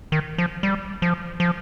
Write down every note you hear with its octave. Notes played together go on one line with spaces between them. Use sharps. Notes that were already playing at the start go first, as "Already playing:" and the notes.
D#3
F3
G3
F3
F3